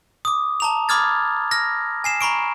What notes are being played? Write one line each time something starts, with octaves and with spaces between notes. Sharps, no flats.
D6 D#6
A5 A#5 F7
B5 D6 D#6 F6 G#6 A6
F6 A#6
G#5 C7 E7
A#5 B5 C#6 D7